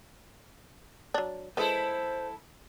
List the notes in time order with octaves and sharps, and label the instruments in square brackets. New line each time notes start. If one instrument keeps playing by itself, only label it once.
[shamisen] F#3 D4
[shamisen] G#3 B4 [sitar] E4 A4 [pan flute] C5